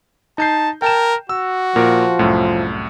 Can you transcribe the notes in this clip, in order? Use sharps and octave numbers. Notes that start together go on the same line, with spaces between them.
D#4 A5 G6 C7
A#4 G5 A5 E7
F#4 E6
A#2 F3 A#4
C2 F#2 A2